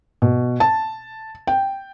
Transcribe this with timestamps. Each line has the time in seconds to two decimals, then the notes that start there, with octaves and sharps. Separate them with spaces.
0.22 B2
0.60 A5
1.47 G5